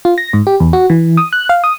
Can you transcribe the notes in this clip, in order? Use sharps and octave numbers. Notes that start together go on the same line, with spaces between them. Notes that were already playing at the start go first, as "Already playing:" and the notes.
F4
A#6
G#2
G4
E2
F#4
E3
D#6
F#6
F5
D#6